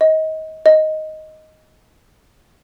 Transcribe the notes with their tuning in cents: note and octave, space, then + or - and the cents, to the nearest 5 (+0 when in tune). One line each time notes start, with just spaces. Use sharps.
D#5 +25
D#5 +5